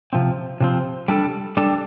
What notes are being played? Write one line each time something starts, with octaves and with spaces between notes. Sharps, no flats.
C3 F3 C4
C3 F3 C4
G3 D4 A4
G3 D4 A4